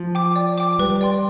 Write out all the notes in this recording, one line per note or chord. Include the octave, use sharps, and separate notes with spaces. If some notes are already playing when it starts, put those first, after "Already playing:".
Already playing: F3
G5 D6
D5
G5 D6
G3 B4
D5 G5 C6